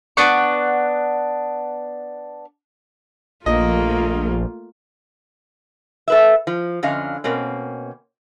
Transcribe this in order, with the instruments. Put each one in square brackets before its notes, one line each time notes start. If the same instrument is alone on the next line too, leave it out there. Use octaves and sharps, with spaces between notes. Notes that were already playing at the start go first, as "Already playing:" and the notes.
[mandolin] B3 D4 F#5 C#6
[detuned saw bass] A#1 [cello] A3 A#3 [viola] F4 [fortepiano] D#5
[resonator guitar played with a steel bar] A4 B4 E5
F3
F2 D3 C#4 D#5 F5
B2 A#3 C4 C#4